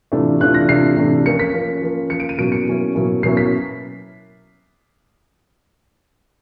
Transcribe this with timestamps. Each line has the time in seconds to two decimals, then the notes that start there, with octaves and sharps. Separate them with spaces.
0.12 C3 E3 A3 D4 F4
0.40 C3 E3 A3 D4 F4 F#6
0.54 A#6
0.69 C3 E3 A3 D4 F4 C7
0.97 C3 E3 A3 D4 F4
1.26 F3 A#3 C#4 C#7
1.39 B6
1.53 F3 A#3 C#4
1.81 F3 A#3 C#4
2.09 F3 A#3 C#4 C#7
2.20 D7
2.29 D#7
2.38 B2 F#3 A#3 C#4 E4 D7
2.52 C#7
2.67 B2 F#3 A#3 C#4 E4
2.95 B2 F#3 A#3 C#4 E4
3.23 B2 F#3 A#3 C#4 E4 C7
3.37 B6